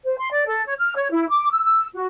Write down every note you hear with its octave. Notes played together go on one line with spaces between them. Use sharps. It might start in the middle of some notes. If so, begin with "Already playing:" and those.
C5
C6
D5
A4
C#5
F6
C#5
E4
D6
E6
E6
F#4